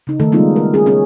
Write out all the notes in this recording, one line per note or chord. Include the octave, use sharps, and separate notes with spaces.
C#3 D#4
D#3 A3 A4
D#3 G3 G#3 B3 D#4 F4
A#4
C#4 G#4
C#4 G#4